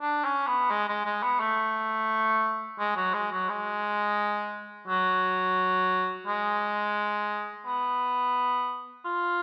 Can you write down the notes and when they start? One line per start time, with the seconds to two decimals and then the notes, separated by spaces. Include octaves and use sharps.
0.01 D4
0.24 C#4
0.47 B3
0.71 G#3
0.89 G#3
1.05 G#3
1.23 B3
1.40 A3
2.79 G#3
2.96 F#3
3.14 G#3
3.32 F#3
3.49 G#3
4.88 F#3
6.27 G#3
7.66 B3
9.05 F4